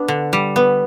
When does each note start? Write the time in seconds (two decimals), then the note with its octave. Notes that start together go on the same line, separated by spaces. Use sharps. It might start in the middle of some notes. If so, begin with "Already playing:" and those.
Already playing: B3 D4
0.08 D3
0.33 G3
0.56 B3